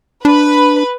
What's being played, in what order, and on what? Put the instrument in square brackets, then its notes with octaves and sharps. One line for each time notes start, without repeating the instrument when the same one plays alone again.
[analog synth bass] D4 [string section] B4